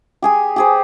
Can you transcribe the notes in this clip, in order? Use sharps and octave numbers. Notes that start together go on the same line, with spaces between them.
G4 G#4 G#5
G4 G#4 C5